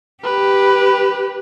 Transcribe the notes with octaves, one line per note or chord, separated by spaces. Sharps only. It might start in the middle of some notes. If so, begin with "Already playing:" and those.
G4 B4